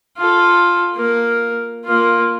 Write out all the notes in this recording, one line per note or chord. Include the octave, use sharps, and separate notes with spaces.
F4 A4
A#3 A#4
A#3 F4